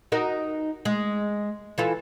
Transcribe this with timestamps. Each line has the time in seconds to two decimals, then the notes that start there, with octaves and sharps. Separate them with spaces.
0.12 D#4 F#4 A#4
0.85 G#3
1.78 E3 F4 A4